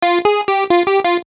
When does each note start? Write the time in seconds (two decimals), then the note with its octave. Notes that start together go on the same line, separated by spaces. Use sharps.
0.02 F4
0.25 G#4
0.48 G4
0.70 F4
0.87 G4
1.05 F4